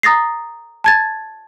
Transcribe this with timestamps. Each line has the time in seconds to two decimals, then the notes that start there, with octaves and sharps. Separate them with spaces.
0.03 A#5 D#6 A6 A#6 C7
0.84 A5 G#6 A6